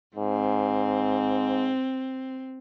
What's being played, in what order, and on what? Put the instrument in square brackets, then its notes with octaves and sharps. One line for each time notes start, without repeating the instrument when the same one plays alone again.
[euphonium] G#2 [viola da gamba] C4